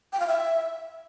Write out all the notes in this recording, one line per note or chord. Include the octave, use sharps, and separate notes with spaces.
G5
F5
E5